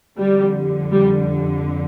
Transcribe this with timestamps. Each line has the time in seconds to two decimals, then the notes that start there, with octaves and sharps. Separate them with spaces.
0.18 F2 D3 G3
0.92 G3